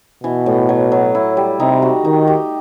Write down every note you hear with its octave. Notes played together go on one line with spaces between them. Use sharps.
B2 E3
A2
F#3
F#3
E4
G3
C3 D#4
F#4
D#3 D#4
G4